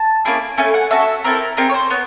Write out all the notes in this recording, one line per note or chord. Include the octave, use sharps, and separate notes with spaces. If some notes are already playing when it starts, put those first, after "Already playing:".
Already playing: A5
A#3 C#4 E4 G#4
A3 C#4 E4 G#5
F#5
C#4 F#4 A4 E5
C4 E4 A4 A#4
C4 D#4 G#4 A#4
C#5
C5
B3 C#5